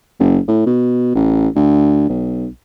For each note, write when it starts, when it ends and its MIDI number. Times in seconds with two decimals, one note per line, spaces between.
0.20 0.38 30
0.48 0.63 45
0.66 1.10 47
1.15 1.48 33
1.55 2.07 38
2.09 2.47 35